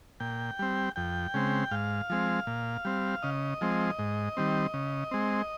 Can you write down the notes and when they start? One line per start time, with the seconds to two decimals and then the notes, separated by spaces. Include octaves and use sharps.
0.20 A#2 G5
0.59 G3 C4
0.96 F2 G5
1.34 C#3 G#3 C4
1.71 G#2 F5
2.10 F3 G#3 C4
2.47 A#2
2.85 G3 C4
3.22 C#3 D#5
3.61 F3 G#3 C4
3.99 G#2
4.37 D#3 G3 C4
4.74 C#3
5.11 G#3 C4